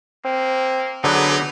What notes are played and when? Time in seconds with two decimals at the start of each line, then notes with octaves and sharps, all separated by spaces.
0.25 A#3 C4
1.04 D3 F#3 B3 D#4 G#4 B4 D6